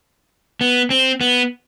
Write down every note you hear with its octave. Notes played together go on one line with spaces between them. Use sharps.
B3
C4
B3